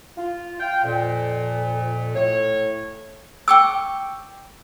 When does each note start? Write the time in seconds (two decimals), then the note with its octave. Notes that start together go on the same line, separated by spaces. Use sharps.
0.17 F4
0.60 F5 G5
0.84 F2 A#2
2.15 A2 C#5
3.48 G5 C#6 D6 E6